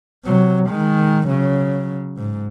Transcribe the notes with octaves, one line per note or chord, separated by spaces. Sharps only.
C3 F#3
D#3 G#3
C#3 F#3
G#2